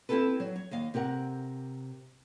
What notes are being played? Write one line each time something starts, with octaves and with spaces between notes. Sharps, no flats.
C4 E4 F4 G4 A4 B4
F#3
C#5
D#2 D#5 F5
C3 G4 A#4 F#5